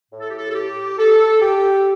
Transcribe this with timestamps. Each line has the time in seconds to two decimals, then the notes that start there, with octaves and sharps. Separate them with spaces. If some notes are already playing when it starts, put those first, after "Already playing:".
0.11 A2
0.20 A4
0.29 G4
0.38 A4
0.50 A4
0.54 G4
0.98 A4
1.41 G4